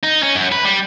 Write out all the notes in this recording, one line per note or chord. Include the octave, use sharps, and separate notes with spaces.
D#4
C#4
F#2
B4
G3